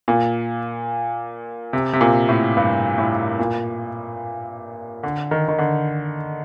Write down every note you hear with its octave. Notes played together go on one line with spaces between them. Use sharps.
A#2
C3
C3
A#2
A2
G2
A2
A#2
D3
D#3
D#3
D3